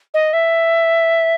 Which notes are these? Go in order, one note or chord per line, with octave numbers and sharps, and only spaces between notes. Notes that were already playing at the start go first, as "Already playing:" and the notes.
D#5
E5